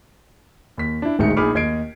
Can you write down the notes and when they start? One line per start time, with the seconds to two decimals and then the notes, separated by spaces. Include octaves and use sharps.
0.78 D#2 B6
1.02 D4 E4
1.19 D1 G#1 G#3 D#4 E5 C#7
1.37 A#1 D#4 G#4 B5 D6 F6
1.55 D#2 D#5 G#6 C7 D7